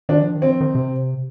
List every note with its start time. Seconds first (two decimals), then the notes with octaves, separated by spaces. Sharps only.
0.09 D#3 D4
0.22 F3
0.34 D#3
0.42 C4
0.48 F3
0.61 D#3
0.75 C3